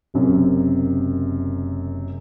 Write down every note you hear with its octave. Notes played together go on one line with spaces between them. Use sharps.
F#1 F#2 C3